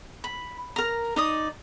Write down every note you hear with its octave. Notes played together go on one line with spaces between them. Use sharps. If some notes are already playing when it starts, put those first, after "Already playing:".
B5
A#4 A#5
D#4 D5 D#6